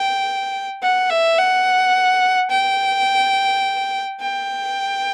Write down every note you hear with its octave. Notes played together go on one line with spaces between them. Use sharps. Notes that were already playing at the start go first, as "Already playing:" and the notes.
Already playing: G5
F#5
E5
F#5
G5
G5